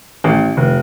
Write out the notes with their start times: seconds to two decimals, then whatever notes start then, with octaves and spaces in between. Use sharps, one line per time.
0.24 A1
0.57 F1